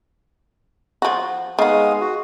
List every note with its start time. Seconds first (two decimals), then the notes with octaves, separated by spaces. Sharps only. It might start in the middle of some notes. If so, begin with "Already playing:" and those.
1.02 F3 F#4
1.59 D#3 G#3 B3 F5 D#6
2.01 F#4